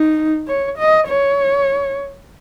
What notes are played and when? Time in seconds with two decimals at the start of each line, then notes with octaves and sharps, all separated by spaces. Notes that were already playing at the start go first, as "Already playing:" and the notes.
Already playing: D#4
0.48 C#5
0.79 D#5
1.09 C#5